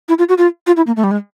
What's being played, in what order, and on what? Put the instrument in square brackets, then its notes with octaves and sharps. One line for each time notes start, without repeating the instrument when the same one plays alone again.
[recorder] E4
F4
F#4
F4
F4
E4
A#3
A3
G3
G#3